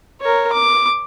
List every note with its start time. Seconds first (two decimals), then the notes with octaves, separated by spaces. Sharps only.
0.21 A#4 C#5
0.52 D6